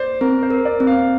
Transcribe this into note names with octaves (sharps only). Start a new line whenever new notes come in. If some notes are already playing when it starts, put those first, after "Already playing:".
Already playing: C5 D5
C4 A#4
C5
A#4
D5
C4
F5